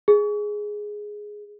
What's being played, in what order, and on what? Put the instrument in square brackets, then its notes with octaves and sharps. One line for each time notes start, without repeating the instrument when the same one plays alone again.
[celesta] G#4